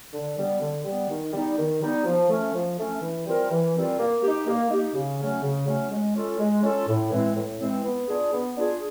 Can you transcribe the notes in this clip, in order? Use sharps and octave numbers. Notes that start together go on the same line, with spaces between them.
D3
G3 B3
D3
G3 B3
D#3
G3 B3 D#4
D#3
G3 B3 D#4
F3
A3 C#4
F3
A3 C#4
E3
G3 C4 F4 A#4
E3
G3 C4 F4 A#4
A#3
D#4 G4
A#3
D#4 G4
C#3
F#3 A3 C#4
C#3
F#3 A3 C#4
G#3
C#4 F4 A4
G#3
C#4 F4 A4
A2
E3 G#3 C4
A2
E3 G#3 C4
B3
D4 F4 G#4
B3
D4 F4 G#4